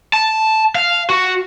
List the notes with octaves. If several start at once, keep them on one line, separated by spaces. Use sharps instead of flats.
A5
F5
F#4